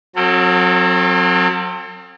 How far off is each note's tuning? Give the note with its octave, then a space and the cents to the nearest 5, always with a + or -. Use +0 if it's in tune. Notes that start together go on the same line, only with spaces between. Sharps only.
F#3 -25 C4 +30 A4 +40